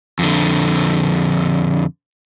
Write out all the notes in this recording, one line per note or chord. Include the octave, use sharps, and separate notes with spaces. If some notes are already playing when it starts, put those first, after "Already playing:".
F2 D3